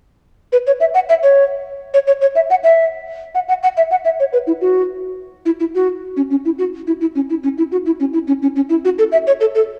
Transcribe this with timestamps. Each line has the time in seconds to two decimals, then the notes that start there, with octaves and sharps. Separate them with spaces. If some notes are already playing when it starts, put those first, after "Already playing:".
0.52 B4
0.67 C#5
0.80 E5
0.94 F#5
1.09 E5
1.23 C#5
1.94 C#5
2.07 C#5
2.21 C#5
2.35 E5
2.50 F#5
2.64 E5
3.35 F#5
3.48 F#5
3.63 F#5
3.77 E5
3.91 F#5
4.05 E5
4.20 C#5
4.33 B4
4.47 E4
4.61 F#4
5.46 E4
5.60 E4
5.75 F#4
6.17 C#4
6.30 C#4
6.45 E4
6.59 F#4
6.87 E4
7.01 E4
7.15 C#4
7.30 E4
7.44 C#4
7.58 E4
7.72 F#4
7.86 E4
8.00 C#4
8.13 E4
8.28 C#4
8.42 C#4
8.56 C#4
8.70 E4
8.85 F#4
8.99 A4
9.12 E5
9.27 C#5
9.41 A4
9.55 A4